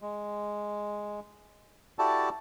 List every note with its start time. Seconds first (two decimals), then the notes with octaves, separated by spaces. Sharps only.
0.01 G#3
1.99 E4 F#4 G4 A4 D5 A5